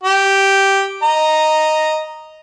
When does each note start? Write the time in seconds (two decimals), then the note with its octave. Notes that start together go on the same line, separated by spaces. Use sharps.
0.03 G4
1.03 D#5 A#5